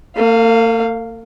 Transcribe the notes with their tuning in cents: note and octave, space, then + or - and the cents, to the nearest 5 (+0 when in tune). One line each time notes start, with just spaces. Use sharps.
A#3 -45 F5 +0